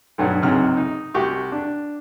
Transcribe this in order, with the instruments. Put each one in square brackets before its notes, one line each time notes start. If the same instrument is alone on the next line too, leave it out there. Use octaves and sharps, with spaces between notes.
[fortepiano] B1 G2 F#3 F#5
C#2 G#2 C3 F#3 F6
D#4
C2 F#4 G4 C#6
D4